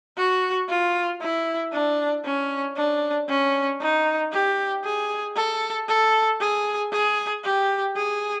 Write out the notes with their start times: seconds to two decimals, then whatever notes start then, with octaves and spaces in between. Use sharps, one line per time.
0.17 F#4
0.69 F4
1.21 E4
1.72 D4
2.24 C#4
2.76 D4
3.29 C#4
3.81 D#4
4.33 G4
4.85 G#4
5.36 A4
5.88 A4
6.40 G#4
6.92 G#4
7.44 G4
7.96 G#4